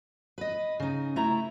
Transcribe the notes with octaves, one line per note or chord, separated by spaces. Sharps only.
B4 D#5
C#3 D#4
A3 E4 A#5